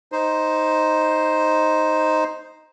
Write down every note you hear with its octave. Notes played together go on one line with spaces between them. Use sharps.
D#4 C5